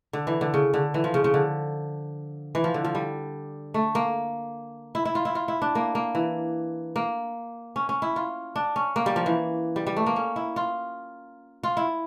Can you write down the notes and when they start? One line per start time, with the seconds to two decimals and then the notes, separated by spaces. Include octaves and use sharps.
0.13 D3
0.27 E3
0.41 D3
0.54 C#3
0.74 D3
0.94 E3
1.04 F3
1.14 C#3
1.24 C#3
1.34 D3
2.55 E3
2.64 F3
2.74 D3
2.84 F3
2.95 G3
3.74 A3
3.95 A#3
4.95 E4
5.05 E4
5.15 F4
5.25 E4
5.35 F4
5.48 E4
5.62 D4
5.75 A#3
5.95 A#3
6.15 E3
6.96 A#3
7.76 C#4
7.89 C#4
8.02 E4
8.16 F4
8.56 D4
8.76 C#4
8.96 A#3
9.06 G3
9.16 F3
9.26 E3
9.76 G3
9.87 G3
9.97 A3
10.06 A#3
10.16 C#4
10.36 E4
10.56 F4
11.63 F4
11.77 E4